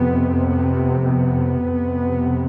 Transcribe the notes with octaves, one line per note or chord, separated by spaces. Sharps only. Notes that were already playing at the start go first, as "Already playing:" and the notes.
Already playing: F2 C3 B3
B3
B3
F2 C3